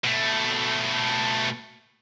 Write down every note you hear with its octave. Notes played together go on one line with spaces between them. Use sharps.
B2 A3